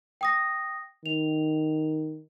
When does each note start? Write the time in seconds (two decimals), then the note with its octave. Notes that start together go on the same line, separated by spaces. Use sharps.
0.21 G5 D#6 A#6
1.06 D#3 F7